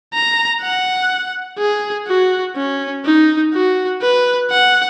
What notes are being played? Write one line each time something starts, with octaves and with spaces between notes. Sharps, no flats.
A#5
F#5
G#4
F#4
C#4
D#4
F#4
B4
F#5